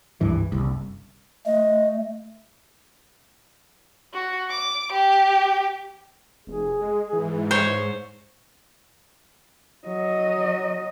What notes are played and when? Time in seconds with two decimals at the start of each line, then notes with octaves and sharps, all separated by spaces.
0.21 G#1 C#2 G2 E3
0.52 F#1 C2
1.46 A3 D#5
4.14 F#4
4.50 D6
4.92 G4
6.47 F1 G#4
6.81 G#3
7.13 G#2 E3
7.51 C5 C#5
9.87 F#3 D#5